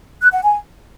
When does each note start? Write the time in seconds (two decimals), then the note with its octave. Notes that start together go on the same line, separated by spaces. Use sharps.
0.22 F#6
0.32 F#5
0.43 G#5